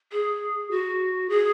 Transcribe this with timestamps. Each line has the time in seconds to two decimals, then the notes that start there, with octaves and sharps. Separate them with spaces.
0.12 G#4
0.71 F#4
1.29 G#4